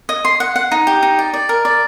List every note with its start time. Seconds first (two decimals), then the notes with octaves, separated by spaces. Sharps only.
0.09 D#5
0.25 C6
0.40 F#5
0.56 F#5
0.71 D#4
0.87 G4
1.03 D#4
1.19 D5
1.34 D5
1.49 A#4
1.65 D5